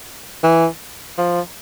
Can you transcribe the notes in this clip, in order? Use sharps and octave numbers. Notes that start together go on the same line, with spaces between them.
E3
F3